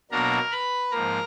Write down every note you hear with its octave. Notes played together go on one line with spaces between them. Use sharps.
B2 F#3 A#3 D4 A#4 A#5
B4 B5
G#2 F3 A#3 A#4 A#5